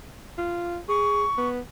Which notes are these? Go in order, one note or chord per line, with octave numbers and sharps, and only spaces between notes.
F4
G#4 C#6
B3